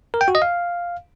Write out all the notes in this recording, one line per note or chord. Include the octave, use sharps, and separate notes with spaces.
A#4
G5
F#4
D#5
F5